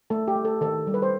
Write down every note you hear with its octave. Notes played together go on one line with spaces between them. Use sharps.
A3 A4
G4
A3
A4
D#3 A4
G3
B4
C5